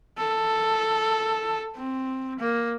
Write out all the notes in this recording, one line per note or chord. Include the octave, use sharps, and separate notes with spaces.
A4
C4
A#3